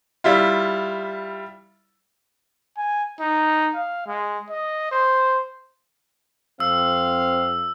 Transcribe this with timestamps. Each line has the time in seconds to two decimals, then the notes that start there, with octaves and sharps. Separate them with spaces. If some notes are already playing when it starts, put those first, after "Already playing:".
0.24 G3 E4 F4
2.77 G#5
3.20 D#4
3.75 F5
4.07 G#3
4.50 D#5
4.92 C5
6.60 F2 C4 F5 E6